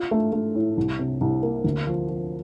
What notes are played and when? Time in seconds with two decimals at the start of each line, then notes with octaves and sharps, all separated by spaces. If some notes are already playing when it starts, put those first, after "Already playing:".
Already playing: F4
0.11 A3
0.32 A3
0.55 A2
0.77 C2
0.99 C3
1.21 C2
1.43 A#3
1.64 D2
1.87 F3
2.09 F3